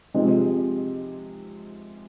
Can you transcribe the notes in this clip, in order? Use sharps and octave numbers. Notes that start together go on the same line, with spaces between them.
C3 F3 G#3 C4